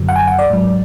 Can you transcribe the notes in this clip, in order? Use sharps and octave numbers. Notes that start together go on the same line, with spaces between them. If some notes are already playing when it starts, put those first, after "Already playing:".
Already playing: F#2 D3 F#3
F#5
G#5
F#5
D5
G#2 F#3